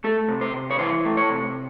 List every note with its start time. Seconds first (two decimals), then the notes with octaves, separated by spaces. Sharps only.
0.04 A3 A4
0.28 C3
0.41 C5
0.54 C3
0.71 C#5
0.79 E3 C5
1.05 A3
1.17 C#5
1.30 C3